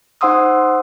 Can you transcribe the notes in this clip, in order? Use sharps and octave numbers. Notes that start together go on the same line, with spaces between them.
D#4 C5 F#5 C6 D#6 E6